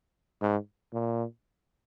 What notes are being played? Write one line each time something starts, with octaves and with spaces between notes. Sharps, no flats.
G#2
A#2